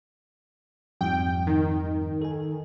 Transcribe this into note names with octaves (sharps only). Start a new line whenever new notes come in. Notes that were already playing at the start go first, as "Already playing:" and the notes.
F2 G#2 G3 G5
D#3
A4 G#5